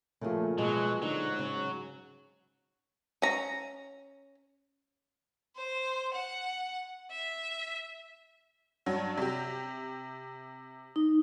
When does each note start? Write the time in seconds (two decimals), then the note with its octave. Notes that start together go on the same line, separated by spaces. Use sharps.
0.21 A#2 C#3 F3 A3 A#3 G#4
0.58 B2 F#3 G#3
1.02 G#2 D3 F#3 D#4
1.39 C#3
3.22 C#4 A#5
5.56 C5
6.14 F#5
7.11 E5
8.86 G2 F#3
9.17 C3 G4
10.96 D#4